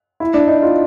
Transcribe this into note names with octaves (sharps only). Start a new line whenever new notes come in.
E4
D4
D#4
F4